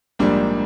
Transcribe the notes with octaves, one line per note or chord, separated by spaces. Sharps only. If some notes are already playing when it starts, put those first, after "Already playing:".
A#1 G#2 G3 A#3 D4